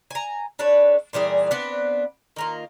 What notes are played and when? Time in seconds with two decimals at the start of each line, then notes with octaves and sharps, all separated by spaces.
0.11 G#5 A#5
0.59 D4 A4 B4 C#5
1.13 A#2 E3 G3 G#4
1.51 B3 C4 D4 B4
2.36 D#3 A#3 F4